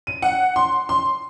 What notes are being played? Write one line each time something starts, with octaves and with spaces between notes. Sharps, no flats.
D#7
F#5
C6
C6